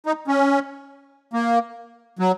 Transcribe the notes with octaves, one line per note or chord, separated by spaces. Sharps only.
D#4
C#4
A#3
F#3